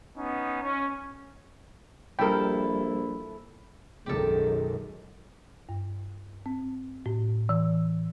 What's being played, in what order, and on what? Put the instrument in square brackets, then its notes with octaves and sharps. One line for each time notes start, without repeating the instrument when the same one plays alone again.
[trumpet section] B3 C#4 D#4
C#4
[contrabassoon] A#1 [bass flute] G3 [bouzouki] E4 A4 [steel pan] A#4 G5
[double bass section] B1 F#2 D#3 [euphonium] G#3 [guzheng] G4 A4
[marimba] G2
C4
A2
E3